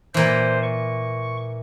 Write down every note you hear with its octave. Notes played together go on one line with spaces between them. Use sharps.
A#2 E3 C5
C#6